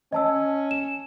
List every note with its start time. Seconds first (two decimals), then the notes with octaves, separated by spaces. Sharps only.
0.13 C#4 D#5 A5 E6
0.71 E7